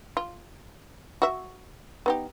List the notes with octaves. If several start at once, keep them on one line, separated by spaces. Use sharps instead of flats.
F4
F#4 E5
B3 D#4 G4